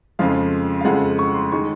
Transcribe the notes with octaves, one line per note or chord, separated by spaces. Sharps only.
F2 C#3 F3 G#3 F5
F5
F2 C#3 F3 G#3 F#5
C#6
C6
D#3 G#3 C#6